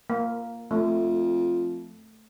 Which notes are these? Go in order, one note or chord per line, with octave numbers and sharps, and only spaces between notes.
A#3
F2 A3